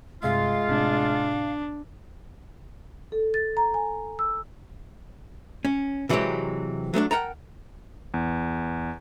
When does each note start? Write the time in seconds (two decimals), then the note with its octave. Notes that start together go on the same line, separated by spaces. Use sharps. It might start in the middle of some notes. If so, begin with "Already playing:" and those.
0.23 G2 C3 G#3 F4 E5 F5
0.69 A2 C3 D4
3.12 A4
3.34 A6
3.57 A#5
3.74 G#5
4.19 E6
5.65 C#4
6.09 C3 E3 F#3 G#3 C4 G4
6.94 F#3 A3 C4 D4
7.11 A#4 F#5 G5 A5 A#5
8.14 E2